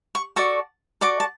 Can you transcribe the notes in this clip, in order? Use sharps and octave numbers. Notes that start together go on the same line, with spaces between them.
C#6
F#4 A4 D5 C#6
F#4 A4 D5 D6
A5